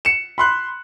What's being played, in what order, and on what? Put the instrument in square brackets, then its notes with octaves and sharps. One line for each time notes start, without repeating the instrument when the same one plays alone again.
[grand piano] C#7 E7
B5 C6 F#6